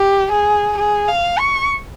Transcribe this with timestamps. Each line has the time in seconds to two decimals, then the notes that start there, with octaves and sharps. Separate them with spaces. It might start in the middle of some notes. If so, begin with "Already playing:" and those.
Already playing: G4
0.32 G#4
0.78 G#4
1.08 F5
1.39 C#6